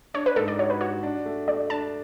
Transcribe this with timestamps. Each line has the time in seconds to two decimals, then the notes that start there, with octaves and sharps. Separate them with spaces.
0.14 D4 C#5
0.26 B4
0.36 G#2 A4
0.48 D5
0.59 F#4 C#5
0.70 B4
0.81 F#4 C#5
1.03 D4
1.25 A3
1.48 A3 D5
1.69 D4 A5